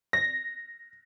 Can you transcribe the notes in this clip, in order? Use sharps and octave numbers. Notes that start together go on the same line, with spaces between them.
A#6